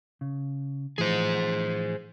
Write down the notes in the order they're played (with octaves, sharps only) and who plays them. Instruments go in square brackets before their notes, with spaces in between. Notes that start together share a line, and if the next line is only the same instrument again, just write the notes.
[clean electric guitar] C#3
[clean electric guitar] A2 E3 F3 [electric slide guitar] G#4 C5